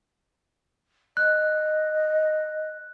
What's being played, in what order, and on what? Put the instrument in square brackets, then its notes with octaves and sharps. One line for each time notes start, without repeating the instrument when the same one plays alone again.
[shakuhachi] D#5 [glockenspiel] F#6